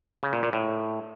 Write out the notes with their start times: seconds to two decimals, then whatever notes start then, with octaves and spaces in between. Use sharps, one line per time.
0.23 C#3
0.33 A#2
0.43 A#2
0.53 A2